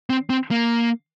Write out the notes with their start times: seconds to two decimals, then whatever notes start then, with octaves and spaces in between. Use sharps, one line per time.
0.10 C4
0.30 C4
0.51 A#3